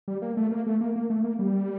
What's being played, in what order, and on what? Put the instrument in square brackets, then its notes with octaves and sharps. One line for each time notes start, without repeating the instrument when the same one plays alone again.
[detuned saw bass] G3
A#3
A3
A#3
A3
A#3
A#3
A3
A#3
G3